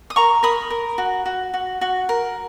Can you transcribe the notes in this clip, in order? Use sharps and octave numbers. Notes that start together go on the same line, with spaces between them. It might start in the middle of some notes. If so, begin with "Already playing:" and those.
D#6
A#4 A#5 C#6
A#4 B5 D#6
A#4
F#4
F#4
F#4
F#4
A#4